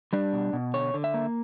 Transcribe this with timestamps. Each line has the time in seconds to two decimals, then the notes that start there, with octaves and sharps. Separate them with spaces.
0.13 G3 D4
0.33 B2
0.53 B2
0.74 D3 C#5
0.94 D3
1.04 E5
1.14 A#3